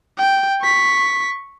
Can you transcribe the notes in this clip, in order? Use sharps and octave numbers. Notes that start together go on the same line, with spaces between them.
G5
C#6 B6